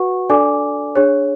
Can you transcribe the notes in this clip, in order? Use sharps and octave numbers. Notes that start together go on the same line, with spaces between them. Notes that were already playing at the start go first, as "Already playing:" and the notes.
Already playing: F#4 B4 F#5 C#6
D4 A4 D5 G#5 D6
D4 G#4 C#5